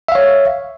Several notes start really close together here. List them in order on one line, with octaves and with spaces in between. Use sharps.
E5 F5 C#5